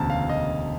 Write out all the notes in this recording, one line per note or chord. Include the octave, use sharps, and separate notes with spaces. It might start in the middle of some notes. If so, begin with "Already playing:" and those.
Already playing: E1 D2 C#3 A5 A#5
F5
D#5